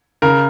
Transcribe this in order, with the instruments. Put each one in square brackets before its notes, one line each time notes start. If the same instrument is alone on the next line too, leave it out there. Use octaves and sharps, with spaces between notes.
[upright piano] C#3 A#4